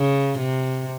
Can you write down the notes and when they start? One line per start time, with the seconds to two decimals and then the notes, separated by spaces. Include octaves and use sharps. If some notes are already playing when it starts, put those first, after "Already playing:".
Already playing: C#3
0.39 C3